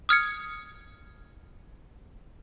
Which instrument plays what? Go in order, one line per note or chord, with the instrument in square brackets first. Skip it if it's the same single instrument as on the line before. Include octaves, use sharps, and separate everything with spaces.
[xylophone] D#6 F6 G#6 C#7